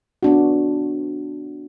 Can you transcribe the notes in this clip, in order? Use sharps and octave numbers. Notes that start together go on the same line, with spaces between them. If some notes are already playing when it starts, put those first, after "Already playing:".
B3 D4 F#4